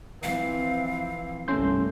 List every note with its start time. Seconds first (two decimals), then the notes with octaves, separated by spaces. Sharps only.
0.23 E3 F3 C4 F5
1.48 G1 C2 A3 C#4 C6 G6